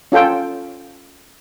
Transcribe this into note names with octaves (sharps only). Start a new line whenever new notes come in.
C#4 F4 A4 G5